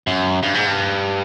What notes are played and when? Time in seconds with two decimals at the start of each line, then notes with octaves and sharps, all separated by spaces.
0.07 F#2
0.43 G2
0.54 G#2
0.66 G2